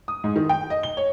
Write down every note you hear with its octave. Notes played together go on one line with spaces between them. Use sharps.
D#6
G#2
D#3
G5
D#5
G7
C#5